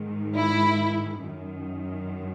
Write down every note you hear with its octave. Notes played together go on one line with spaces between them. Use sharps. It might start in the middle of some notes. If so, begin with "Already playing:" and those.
Already playing: G#2 D#3
E4
F#2 D#3